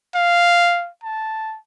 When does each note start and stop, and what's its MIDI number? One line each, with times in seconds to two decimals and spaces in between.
0.15 0.89 77
1.03 1.57 81